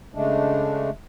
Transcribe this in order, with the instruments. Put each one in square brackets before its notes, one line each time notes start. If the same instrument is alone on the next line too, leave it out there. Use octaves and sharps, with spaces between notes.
[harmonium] C#3 G#3 A3 D4